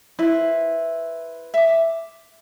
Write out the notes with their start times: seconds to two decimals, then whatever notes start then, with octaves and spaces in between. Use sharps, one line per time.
0.19 E4 B4 C5
1.54 E5 D6